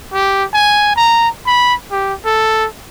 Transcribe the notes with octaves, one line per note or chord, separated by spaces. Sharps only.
G4
G#5
A#5
B5
G4
A4